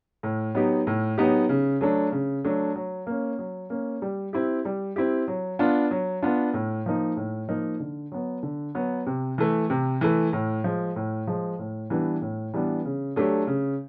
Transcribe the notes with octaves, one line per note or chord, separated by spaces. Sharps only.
A2
F#3 B3 D#4 G4
A2
F#3 B3 D#4 G4
C#3
F#3 A3 D4
C#3
F#3 A3 D4
F#3
A#3 C#4
F#3
A#3 C#4
G3
C4 E4 G4
G3
C4 E4 G4
F#3
B3 D4 F4
F#3
B3 D4 F4
A2
F3 A#3 D#4
A2
F3 A#3 D#4
D3
F#3 B3
D3
F#3 B3
C3
E3 A3
C3
E3 A3
A2
F3 G#3
A2
F3 G#3
A2
E3 G3 B3 D4
A2
E3 G3 B3 D4
C#3
F#3 A3 D4 G4
C#3